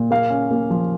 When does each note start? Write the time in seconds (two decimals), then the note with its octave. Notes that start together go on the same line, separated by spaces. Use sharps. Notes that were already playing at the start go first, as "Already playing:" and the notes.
Already playing: A#2
0.11 A#3 F5
0.30 C#4
0.51 A#3
0.70 F3